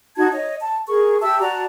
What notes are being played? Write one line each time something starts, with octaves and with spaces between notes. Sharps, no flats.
D#4 F#4 A5 G#6
C#5 D#5
A5
G#4 A#4 C#6
G4 E5 A5 E6
F#4 D5 A5 A#5